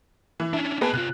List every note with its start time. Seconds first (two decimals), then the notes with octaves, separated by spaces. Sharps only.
0.40 E3
0.53 C#4 D4 E4
0.81 B3 G#4 B4 D#5 A5
0.94 C3 F4 F#6